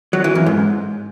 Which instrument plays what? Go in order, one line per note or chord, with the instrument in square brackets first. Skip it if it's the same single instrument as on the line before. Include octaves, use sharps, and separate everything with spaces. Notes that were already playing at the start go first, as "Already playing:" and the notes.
[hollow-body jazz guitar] F#3
E3
F#2
G#2